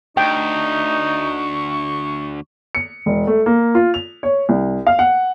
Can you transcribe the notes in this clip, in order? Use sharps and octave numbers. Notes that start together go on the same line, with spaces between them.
D2 D#4 G5 C#6
C#7
E1
A3
A#3
F4
F7
C#5
C2
F5
F#5